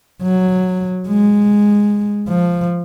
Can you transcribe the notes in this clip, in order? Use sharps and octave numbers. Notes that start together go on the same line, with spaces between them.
F#3
G#3
F3